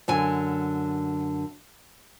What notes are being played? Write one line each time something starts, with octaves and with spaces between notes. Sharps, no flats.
F#2 D3 G#5